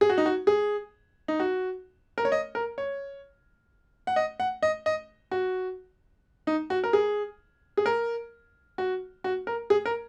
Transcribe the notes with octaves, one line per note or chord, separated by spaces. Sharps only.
G#4
F#4
D#4
F#4
G#4
D#4
F#4
A#4
C#5
D#5
A#4
C#5
F#5
D#5
F#5
D#5
D#5
F#4
D#4
F#4
A#4
G#4
G#4
A#4
F#4
F#4
A#4
G#4
A#4